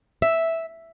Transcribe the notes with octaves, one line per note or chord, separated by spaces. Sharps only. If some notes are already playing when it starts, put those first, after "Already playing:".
E5